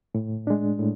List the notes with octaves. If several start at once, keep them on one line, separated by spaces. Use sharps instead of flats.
A2
G#3 D4
A2